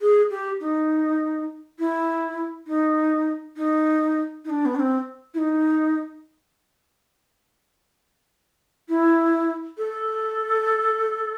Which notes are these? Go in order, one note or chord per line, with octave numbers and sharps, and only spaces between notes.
G#4
G4
D#4
E4
D#4
D#4
D#4
D4
B3
D4
C4
E4
D#4
E4
A4